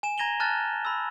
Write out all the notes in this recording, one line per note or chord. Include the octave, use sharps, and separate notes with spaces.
G#5 E7
A#5 G#6 A#6 D#7 F7 G7
A5 A#5 F6 F#6 A6
B5 E6